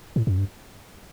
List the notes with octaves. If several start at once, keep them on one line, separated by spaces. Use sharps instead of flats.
A2
F#2
G2